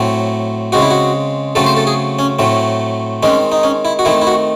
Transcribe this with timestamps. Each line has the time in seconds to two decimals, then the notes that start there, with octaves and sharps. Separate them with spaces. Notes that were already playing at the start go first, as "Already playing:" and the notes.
Already playing: A2 F#3 C4
0.72 C#3 G#3 C4 F#4
0.82 E4
0.91 F#4
1.55 C#3 F#3 A3 C4 A4
1.66 C5
1.77 A4
1.87 G#4
2.19 C#4
2.39 A2 F#3 A3 C4
3.23 D#3 G#3 C4 C#4
3.52 D#4
3.63 C#4
3.85 E4
3.99 F#4
4.05 D#3 A3 C4 E4
4.21 E4
4.27 F#4